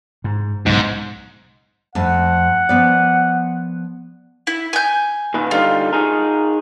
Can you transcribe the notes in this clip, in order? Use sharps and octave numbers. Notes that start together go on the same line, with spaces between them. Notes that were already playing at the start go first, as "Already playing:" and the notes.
G#2
B1 G#2 C#3
F2 A3 F#5 A5
F3 B3 D5
E4
G#5 G6
A#2 D#3 B4
D3 G3 D#4 F4
D#4 G#4 A#4